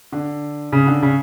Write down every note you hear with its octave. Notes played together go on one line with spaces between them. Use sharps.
D3
C#3
D3
C#3